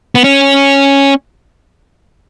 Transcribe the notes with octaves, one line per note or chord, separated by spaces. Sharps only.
B3
C#4